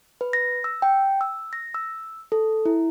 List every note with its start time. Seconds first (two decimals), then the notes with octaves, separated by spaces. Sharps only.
0.21 B4
0.33 A#6
0.64 E6
0.82 G5
1.21 E6
1.53 A#6
1.74 E6
2.32 A4
2.65 E4